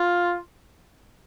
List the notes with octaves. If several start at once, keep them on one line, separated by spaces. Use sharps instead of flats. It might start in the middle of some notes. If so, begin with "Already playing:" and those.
Already playing: F4